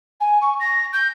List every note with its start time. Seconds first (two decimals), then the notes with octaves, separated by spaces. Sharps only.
0.20 G#5
0.41 C#6
0.60 A#6
0.93 G6